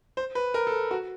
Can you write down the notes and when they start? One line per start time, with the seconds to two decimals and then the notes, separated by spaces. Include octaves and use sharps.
0.17 C5
0.35 B4
0.54 A#4
0.67 A4
0.91 F#4